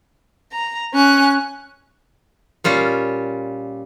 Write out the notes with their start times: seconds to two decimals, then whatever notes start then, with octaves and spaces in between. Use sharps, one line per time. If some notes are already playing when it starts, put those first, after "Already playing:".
0.53 A#5
0.94 C#4 F#6
2.64 A#2 G3 C#4 F4